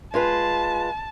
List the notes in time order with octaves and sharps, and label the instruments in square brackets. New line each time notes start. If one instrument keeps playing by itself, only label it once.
[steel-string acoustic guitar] G#3 F4 B4 [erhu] A5